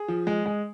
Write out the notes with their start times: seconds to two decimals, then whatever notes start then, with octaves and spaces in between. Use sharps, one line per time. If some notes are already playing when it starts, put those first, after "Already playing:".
Already playing: G#4
0.08 F3
0.27 G#3
0.46 G#3